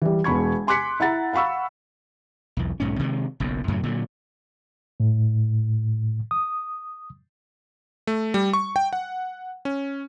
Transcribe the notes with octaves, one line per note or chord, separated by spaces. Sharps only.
E3 G3
E1 E2 B5 C#6 G#6
G#5 C6 D6 F#6 B6 C#7
E4 F#5 A#5 A6
F5 F#5 B5 C#6 E6
B1 E2
B1 G#2 C#4
C3 D#3 G3 G#3
F#1 B1 F#2
F#2 A2 C#3 F#3
A#2 D3 E3 F#3
A2
D#6
A3
G3
C#6
G5
F#5
C#4